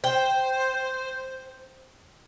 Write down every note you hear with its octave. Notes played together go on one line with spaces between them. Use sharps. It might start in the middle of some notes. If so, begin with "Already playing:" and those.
C5 G5